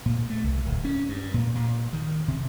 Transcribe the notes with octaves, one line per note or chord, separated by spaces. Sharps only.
A#2
A3
C2
D1
C#4
G2
A#2
A#2
D#3
C3